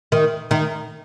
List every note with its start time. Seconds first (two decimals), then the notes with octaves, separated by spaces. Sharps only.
0.12 D#3
0.51 D#3